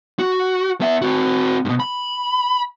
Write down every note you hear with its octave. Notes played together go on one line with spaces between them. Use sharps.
F#4
B3 E5
C4 F#4
G2 B2
B5